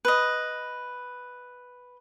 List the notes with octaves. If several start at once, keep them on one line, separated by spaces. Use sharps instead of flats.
B4 D#5